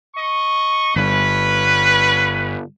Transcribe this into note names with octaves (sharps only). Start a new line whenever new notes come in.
D#5 C#6
G1 C#4 B4